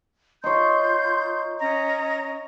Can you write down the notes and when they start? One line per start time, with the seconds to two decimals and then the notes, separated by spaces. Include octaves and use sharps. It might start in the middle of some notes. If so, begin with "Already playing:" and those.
0.44 D#4 F4 C#5 C6 G6
1.60 C#4 D#5 A#5